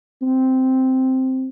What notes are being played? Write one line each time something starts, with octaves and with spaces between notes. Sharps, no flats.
C4